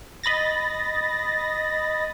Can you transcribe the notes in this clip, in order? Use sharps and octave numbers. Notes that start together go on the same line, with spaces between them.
D#5 B5 A6 A#6